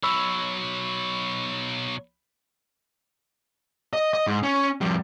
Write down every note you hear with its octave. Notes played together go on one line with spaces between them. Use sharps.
B1 F#3 B5 C#6 E6
D#5
D#5
G#2
C#4
F2 G3